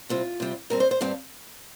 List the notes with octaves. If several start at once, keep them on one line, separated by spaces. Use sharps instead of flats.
C3 G3 C4 F4
C3 G3 C4
G2 G3 C4 A#4
C5
C5
G2 G3 C4 F5